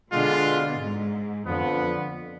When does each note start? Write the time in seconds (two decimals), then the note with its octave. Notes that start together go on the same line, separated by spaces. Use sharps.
0.12 B2 D3 G#3 D4 F4
0.79 G#2
1.46 F2 D3 F3 B3
1.80 F2